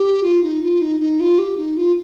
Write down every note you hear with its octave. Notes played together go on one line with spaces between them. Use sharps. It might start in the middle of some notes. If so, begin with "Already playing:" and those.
Already playing: G4
F4
D#4
F4
D#4
D#4
F4
G4
D#4
F4